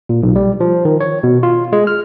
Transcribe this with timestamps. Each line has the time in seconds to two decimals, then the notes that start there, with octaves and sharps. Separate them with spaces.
0.09 A#2
0.23 B1
0.36 G3
0.60 F3
0.85 D#3
1.00 C#5
1.23 B2
1.43 F4
1.73 G#3
1.87 F6